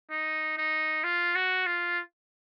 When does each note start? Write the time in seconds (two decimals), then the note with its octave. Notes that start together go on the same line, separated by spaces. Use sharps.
0.10 D#4
0.57 D#4
1.04 F4
1.36 F#4
1.66 F4